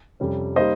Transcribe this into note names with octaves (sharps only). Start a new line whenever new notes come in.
F2 C3 G3 C#4
G3 A#3 D#4 C5 D#5